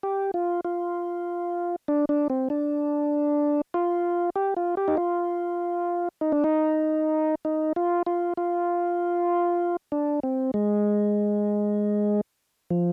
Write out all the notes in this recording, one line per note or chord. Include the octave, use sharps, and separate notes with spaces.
G4
F4
F4
D4
D4
C4
D4
F4
G4
F4
G4
D#4
F4
D#4
D4
D#4
D#4
F4
F4
F4
D4
C4
G#3
F3